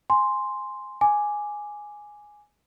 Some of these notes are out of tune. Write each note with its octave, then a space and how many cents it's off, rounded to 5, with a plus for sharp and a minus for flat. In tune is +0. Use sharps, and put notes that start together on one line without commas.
G#5 +0 C6 +0
G#5 +0 D6 +0